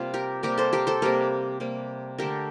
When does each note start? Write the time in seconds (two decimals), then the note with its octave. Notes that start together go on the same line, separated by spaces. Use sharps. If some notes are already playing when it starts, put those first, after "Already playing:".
Already playing: C3 G3 A#3 F4
0.14 G4 A#4
0.43 C3 G3 A#3 G4 A#4
0.58 A4 C5
0.73 G4 A#4
0.87 A4 C5
1.02 C3 G3 A#3 G4 A#4
1.60 C3 G3 A#3
2.18 D3 A3 G4 A#4